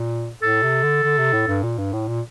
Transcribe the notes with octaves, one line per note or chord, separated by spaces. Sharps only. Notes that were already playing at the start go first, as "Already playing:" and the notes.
Already playing: A#2
A2 A4
C3
D3
D3
C3
A2
G2
A#2
G2
A2
A#2